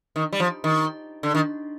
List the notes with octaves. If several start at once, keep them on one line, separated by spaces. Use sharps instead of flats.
D#3
G3
F3
D#3
D3
D#3